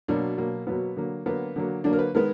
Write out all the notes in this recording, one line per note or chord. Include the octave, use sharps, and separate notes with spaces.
B2 F#3 A#3 D4
B2 F#3 A#3
B2 F#3 A#3 B3
D3 F#3 A#3
D3 F#3 A#3 B3
D3 F#3 A#3
D3 F#3 A#3 D4
A#4
B4
D#3 G#3 B3 A#4